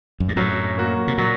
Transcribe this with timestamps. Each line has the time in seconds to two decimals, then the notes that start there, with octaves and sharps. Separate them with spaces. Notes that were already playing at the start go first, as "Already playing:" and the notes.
0.20 F#2
0.28 G2
0.36 F#2 A2 F#3
0.77 A#3 F#4
1.08 C3
1.18 A#2 F#3